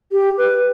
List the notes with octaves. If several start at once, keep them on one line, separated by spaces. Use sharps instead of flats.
G4
B4